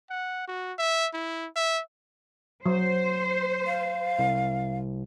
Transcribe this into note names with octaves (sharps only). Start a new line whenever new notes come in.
F#5
F#4
E5
E4
E5
F#3 C5
F5
C2